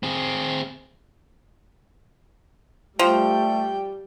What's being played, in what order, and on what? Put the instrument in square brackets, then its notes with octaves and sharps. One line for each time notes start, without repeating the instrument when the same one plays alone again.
[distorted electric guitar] C4 G#4
[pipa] F3 [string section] G3 [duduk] A3 [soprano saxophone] G5